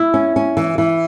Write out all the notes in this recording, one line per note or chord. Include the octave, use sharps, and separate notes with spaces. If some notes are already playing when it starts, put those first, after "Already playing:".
Already playing: E4
C#4
C#4
E3
E3